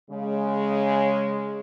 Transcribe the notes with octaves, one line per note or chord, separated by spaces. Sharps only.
C#3 G#3